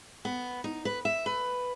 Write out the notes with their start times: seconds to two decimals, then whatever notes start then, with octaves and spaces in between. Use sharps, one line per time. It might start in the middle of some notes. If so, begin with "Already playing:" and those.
0.25 B3
0.64 D#4
0.85 B4
1.05 E5
1.26 B4